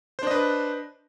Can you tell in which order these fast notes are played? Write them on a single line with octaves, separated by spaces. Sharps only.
C5 D4 D#5 B4